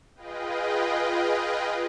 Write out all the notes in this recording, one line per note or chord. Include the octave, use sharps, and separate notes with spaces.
F4 G#4 B4 D#5 F5 G5